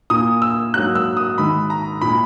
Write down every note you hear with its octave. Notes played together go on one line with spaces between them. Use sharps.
A#2 A#3 D#6
E6
G#2 F#3 A#3 F#6
E6
D#6
G#2 D#3 G#3 B5
A#5
A#2 G#3 B5